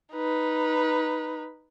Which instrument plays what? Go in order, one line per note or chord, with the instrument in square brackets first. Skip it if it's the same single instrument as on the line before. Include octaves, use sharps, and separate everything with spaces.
[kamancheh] D#4 B4